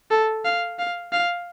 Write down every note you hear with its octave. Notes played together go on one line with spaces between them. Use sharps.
A4
F5
F5
F5